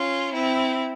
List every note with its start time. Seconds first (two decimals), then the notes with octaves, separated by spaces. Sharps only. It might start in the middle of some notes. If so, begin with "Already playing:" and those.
Already playing: C#4 F4
0.33 C4 E4